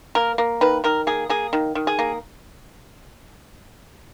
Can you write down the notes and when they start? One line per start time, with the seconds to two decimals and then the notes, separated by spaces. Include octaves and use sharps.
0.15 A#3 A#4
0.38 A#3
0.61 D#3 B4
0.84 D#3 A#4
1.07 A#3 G#4
1.29 A#3 G#4
1.53 D#3
1.75 D#3
1.87 G#4
1.99 A#3